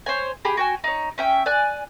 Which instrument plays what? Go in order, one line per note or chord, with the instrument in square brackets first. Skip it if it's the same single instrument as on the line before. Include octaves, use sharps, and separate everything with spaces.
[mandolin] C5 C#5 G#5
G4 G#4 G5 B5
F#4 G5 G#5
D#4 C#5
C#4 E5 G5
D5 G#5 F#6